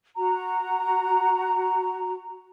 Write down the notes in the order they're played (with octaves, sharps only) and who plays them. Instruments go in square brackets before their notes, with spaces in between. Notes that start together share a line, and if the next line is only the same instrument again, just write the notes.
[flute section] F#4 A#5